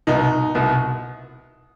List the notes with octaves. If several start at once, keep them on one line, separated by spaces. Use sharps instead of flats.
C2 B2 D#4
C2 B2